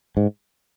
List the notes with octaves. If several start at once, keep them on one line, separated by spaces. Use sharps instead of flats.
G#2